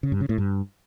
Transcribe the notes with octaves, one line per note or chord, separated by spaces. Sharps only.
C#3
G2
C#3
A2
G2